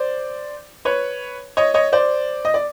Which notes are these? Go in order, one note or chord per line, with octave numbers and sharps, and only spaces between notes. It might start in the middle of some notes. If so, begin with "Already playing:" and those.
Already playing: C5 D5
B4 C#5
C#5 D#5
C#5 D#5
C5 D5
D#5
D5